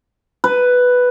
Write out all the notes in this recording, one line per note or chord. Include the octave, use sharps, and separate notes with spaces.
B4